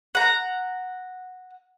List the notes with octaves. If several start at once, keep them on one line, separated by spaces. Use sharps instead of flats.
F#5 A#5